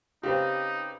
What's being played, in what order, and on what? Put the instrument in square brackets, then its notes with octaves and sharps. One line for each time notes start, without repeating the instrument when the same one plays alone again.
[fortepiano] C#3 C4 [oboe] D#4 [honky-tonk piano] G4 B4